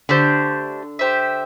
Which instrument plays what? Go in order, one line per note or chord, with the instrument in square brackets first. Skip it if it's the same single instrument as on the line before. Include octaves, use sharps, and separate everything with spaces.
[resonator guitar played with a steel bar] D3 [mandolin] A3 D4 G4 C5
[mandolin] G4 C5 E5